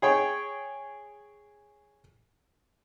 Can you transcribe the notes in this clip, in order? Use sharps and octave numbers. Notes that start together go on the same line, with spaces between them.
G#4 C#5 G5